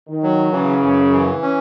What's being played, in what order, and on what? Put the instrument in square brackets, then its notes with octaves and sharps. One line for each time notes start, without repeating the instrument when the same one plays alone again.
[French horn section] D#3
[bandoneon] F#3
[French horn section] C#3 [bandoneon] E3
[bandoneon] F#2
E3
C#4